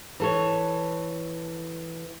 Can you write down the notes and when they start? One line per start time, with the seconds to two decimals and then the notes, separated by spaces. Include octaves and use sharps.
0.20 E3 A4 C#5